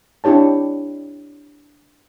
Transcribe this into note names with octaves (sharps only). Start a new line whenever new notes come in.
D4 E4 G4 C#5 A5